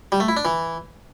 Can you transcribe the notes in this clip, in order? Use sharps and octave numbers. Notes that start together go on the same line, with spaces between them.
G3
A3
E4
D4
E3